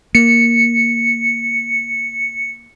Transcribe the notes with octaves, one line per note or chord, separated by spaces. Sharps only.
A#3 C#7